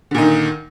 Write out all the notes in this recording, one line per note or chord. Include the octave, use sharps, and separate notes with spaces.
A#2 D3 D#3 D#4